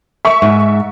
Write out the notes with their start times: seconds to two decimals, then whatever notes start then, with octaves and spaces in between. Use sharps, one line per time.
0.25 E5 C#6
0.42 G#2